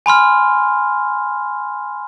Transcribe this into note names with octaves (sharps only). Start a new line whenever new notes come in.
G#5 B5 C6 F6